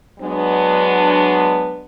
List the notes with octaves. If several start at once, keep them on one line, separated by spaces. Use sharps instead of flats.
F#3 G#3 B3 D4